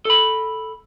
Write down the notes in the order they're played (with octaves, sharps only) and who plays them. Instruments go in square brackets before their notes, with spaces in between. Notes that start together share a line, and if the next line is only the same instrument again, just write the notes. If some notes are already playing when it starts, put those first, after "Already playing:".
[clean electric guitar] A4 B5